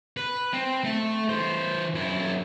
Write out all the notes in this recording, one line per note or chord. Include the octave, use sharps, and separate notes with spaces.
B4
C4
A3 A4
E3 C5
F#2 E4